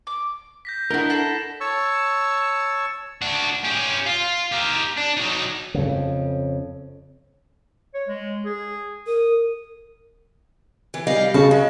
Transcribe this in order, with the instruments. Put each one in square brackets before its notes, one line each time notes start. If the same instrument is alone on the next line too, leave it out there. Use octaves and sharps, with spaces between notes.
[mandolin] D6
[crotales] G6 A#6 B6
[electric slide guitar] D4 E4 A#4 [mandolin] F#4 D#5
[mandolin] A4 F#5 B5 [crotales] C7 E7
[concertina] C#5 A5 C#6 E6
[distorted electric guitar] D4 F#4
C#4 G4
F4
G4 A#4
D4
F#3 D#4
[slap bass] F2 C#3
[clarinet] C#5
G#3
G#4
[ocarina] A#4 [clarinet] D#6
[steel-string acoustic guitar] E3
G3 D#5 F5
[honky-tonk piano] C#3 [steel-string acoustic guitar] F#4 A5
[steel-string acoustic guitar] G#3